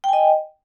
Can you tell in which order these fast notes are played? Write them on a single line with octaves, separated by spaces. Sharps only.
G5 G#5 D#5